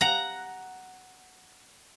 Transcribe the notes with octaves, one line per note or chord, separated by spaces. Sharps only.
F#5 A#5